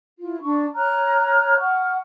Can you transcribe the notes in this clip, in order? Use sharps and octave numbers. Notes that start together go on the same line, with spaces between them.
E4 F4
D4 C#6
C#5 A#5 F6 F#6
F#5 C#6 F6